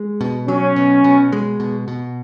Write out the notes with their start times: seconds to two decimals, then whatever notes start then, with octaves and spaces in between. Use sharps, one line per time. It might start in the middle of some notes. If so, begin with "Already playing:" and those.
Already playing: G#3
0.21 B2
0.48 F#3 C#4
0.76 B2
1.04 B2
1.32 G#3
1.60 B2
1.88 B2